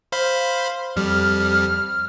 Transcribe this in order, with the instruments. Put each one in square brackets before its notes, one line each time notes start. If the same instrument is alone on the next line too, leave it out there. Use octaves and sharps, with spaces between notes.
[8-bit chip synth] C5 F5 B5
[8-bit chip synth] F2 G3 [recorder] F6